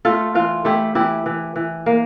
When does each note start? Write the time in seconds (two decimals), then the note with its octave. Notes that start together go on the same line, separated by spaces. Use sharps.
0.05 A3 F4 A4
0.35 E3 F4
0.65 A3 E4 G4
0.95 E3 E4 G4
1.26 E3
1.56 E3
1.86 A#3